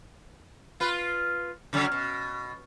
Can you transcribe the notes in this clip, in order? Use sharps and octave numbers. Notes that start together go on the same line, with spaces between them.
F4 B4
C#3 F#3 C#4
B2